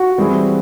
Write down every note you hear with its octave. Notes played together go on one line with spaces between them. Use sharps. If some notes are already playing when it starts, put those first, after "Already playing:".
Already playing: F#4
E3 G3 C4 E4 G#4